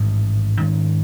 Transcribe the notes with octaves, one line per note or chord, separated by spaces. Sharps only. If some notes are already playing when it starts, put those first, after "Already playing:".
Already playing: A1 G#2 D#3 G#3
G#2 D#3 G#3 C#4